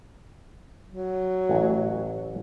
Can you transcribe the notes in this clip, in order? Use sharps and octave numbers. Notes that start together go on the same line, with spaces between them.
F#3
A1